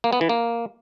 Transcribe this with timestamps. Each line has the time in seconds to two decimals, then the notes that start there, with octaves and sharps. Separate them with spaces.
0.04 A#3
0.13 B3
0.21 E3
0.29 A#3